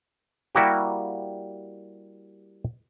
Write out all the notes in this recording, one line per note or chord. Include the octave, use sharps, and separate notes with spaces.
G3 A#3 E4 F#4 G4